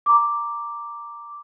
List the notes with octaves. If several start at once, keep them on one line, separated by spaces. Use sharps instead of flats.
A#5 D6